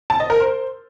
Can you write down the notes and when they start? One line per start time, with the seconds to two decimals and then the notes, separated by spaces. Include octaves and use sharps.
0.10 A5
0.20 D#5
0.30 A#4
0.40 C5